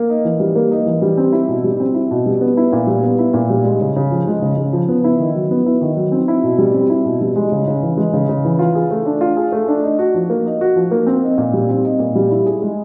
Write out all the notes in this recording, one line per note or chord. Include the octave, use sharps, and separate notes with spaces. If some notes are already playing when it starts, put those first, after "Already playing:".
Already playing: A#3
D#4
E3
G3
A#3
D#4
E3
G3
C4
E4
B2
G3
C4
E4
B2
G3
B3
E4
A#2
G3
B3
E4
A#2
G3
G#3
C#3
C#3
F3
G#3
C#3
C#3
F3
B3
E4
D#3
F#3
B3
E4
D#3
F#3
C4
E4
B2
G3
C4
E4
B2
G3
G#3
C#3
C#3
E3
G#3
C#3
C#3
E3
F4
G#4
A3
D4
F4
G#4
A3
D4
D#4
F#4
F3
A#3
D#4
F#4
F3
A#3
C4
D#4
A#2
G3
C4
D#4
A#2
G3
E4
G#4
G#3